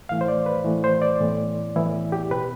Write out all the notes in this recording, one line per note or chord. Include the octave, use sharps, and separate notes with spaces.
A2 E3 A3 F5
C5
D5
B4
A2 E3 A3
C5
D5
A2 E3 B3
A2 E3 B3 E4
G4
B2 B3 B4